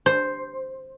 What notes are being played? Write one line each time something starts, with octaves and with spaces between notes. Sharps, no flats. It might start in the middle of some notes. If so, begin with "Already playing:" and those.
C5